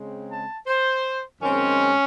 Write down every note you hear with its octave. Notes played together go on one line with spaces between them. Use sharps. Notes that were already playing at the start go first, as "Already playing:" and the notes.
Already playing: C#3 G#3 C4
A5
C5
F#2 D#3 G#3 C4 C#4